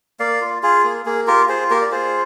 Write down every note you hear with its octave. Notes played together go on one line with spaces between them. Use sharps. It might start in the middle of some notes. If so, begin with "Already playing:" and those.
A#3 D5 F5
F4
F4 G#4
A#3
A#3 G#4
F4 G4 A#4
F4 G#4 C5
A#3 G4 A#4
D5
F4 G#4 C5